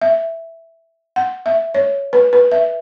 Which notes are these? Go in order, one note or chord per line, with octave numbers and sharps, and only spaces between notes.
E5
F#5
E5
C#5
B4
B4
E5